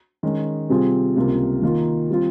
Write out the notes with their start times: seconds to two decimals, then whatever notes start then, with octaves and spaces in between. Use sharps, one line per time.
0.23 D#3 G#3 C#4
0.69 C3 G3 C4 F4 G#4
1.16 C#2 C3 G3 A#3 F4
1.62 D#3 A#3 F4 A#4
2.10 G3 C4 F4